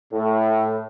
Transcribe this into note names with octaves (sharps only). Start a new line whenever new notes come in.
A2